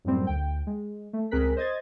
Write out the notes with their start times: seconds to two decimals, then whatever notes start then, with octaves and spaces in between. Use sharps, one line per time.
0.05 F#2 A2 F#3 G3 C4
0.27 D2 G5
0.67 G#3
1.13 A3
1.31 C#2 C4 G#4 A#4 F#6 B6
1.56 C5 D#5 G#6 A6